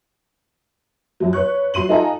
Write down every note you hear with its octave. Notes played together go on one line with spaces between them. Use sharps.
F#2 F#3
B4 C#5 C#6 F#6
F#3 C6 D#7 F#7
D#4 F4 A4 D#5 G#5 A#5